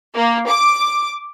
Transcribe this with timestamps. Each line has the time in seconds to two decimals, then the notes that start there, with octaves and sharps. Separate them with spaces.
0.14 A#3
0.47 D6